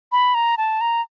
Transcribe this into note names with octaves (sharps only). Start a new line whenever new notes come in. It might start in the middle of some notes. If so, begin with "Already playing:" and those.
B5
A#5
A5
A#5